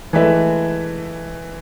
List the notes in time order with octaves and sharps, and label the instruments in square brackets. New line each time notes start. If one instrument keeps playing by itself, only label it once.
[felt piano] E3 G#3 A3 B4 E5